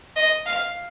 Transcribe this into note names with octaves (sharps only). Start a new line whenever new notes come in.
D#5
F5